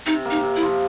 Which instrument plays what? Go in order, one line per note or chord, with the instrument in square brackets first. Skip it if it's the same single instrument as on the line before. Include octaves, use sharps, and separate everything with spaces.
[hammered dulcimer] C3 [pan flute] D#4
[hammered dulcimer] A#3
[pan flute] D#4
[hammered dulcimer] C3
[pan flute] E4
[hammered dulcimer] F3